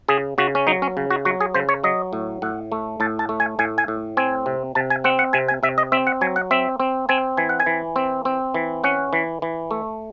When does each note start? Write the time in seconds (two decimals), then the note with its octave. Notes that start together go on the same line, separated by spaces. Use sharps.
0.08 C#3 G#4
0.38 C#3 F#4
0.55 C#4
0.67 F#3 D#4
0.82 C#4
0.97 C#3
1.10 F#4
1.25 F#3 F#4
1.41 G#4
1.54 C#3 C5
1.69 C#5
1.84 F#3 D#5
2.13 A2
2.42 A2 F#5
2.72 A3
3.00 A2 A5
3.19 A5
3.29 A3
3.40 G#5
3.59 A2 G#5
3.78 G#5
3.88 A2
4.17 C4 G#5
4.46 C3
4.75 C3 A5
4.90 G#5
5.04 C4 F#5
5.19 F#5
5.33 C3 G#5
5.48 G#5
5.63 C3 E5
5.78 D#5
5.92 C4 E5
6.07 F#5
6.21 F#3 G#5
6.36 F#5
6.51 C4 E5
6.80 C4
7.09 C4 G#5
7.37 E3 G#5
7.49 F#5
7.60 G#5
7.66 E3
7.96 C4
8.25 C4
8.54 E3
8.84 C#4 F#5
9.13 E3
9.42 E3
9.71 A3